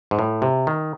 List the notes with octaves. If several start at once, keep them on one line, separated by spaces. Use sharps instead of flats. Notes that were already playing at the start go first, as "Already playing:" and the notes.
G#2
A2
C3
D#3